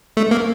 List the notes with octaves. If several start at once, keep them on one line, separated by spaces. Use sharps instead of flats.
A3
A#3